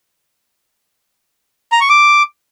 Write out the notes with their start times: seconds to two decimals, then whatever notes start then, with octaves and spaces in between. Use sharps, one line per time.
1.72 A#5
1.81 C#6
1.89 D6